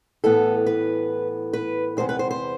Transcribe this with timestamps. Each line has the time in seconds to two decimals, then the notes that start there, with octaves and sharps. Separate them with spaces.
0.24 A2 E3 B3 A4
0.66 B4
1.53 B4
1.97 E2 C3 G#3 B3 C5
2.09 B4
2.19 C5
2.31 C5